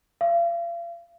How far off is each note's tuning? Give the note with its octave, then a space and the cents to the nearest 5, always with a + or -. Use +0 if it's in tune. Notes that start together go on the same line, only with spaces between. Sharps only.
F5 -40